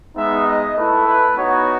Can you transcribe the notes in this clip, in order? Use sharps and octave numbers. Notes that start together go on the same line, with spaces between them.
G#3 B3 D#4 E5
D#5
A3 E4 B4
B4
B3 D#4 F#4 C#5